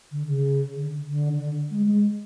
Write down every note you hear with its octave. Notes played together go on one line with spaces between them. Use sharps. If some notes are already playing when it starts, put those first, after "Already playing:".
D3
C#3
D3
D3
D3
G#3
G#3